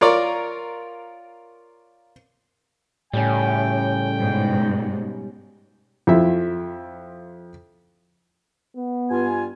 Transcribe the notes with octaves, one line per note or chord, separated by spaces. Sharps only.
F4 A#4 C#5 D5
A2 C#3 G3 C#4 G5
G#2 B2
F2 E4 F4 E5
B3
G2 F4 G#5